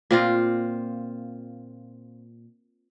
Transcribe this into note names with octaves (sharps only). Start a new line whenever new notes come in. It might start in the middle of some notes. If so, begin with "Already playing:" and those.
A#2 C4 F4